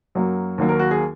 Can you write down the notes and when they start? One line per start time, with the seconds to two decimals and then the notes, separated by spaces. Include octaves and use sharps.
0.15 F#2 F#3 A#3
0.58 D#2 D#3 F#3 A#3
0.69 A#4
0.79 F#4
0.91 G#4